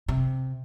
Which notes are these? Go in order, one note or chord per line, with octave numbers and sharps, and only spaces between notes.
C3